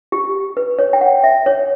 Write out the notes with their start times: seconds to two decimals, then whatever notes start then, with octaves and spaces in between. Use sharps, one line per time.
0.12 G4
0.57 B4
0.79 C#5
0.93 G5
1.01 F#5
1.24 E5
1.46 C#5